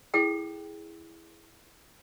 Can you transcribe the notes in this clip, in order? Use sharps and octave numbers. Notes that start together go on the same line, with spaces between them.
E4 G#4 A4 G5